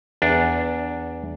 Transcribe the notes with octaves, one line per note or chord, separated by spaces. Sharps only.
E2 D4